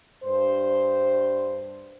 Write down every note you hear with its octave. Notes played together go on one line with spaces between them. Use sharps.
G2 C5